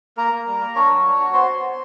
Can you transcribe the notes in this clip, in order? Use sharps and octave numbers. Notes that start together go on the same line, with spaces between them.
A#3 A#4 A#5
A#3
G3
A#3
D4 C#5 C#6
F#3
D4
F#4
B3 C5 C6
B3
B3